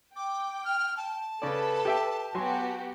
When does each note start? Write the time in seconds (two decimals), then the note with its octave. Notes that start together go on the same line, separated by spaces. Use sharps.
0.16 G5 D6
0.65 F6
0.97 A5
1.42 C#3 A4 B4 D5
1.85 G4 E5 G5
2.35 F#3 B3 F#4 G4 G#5 C6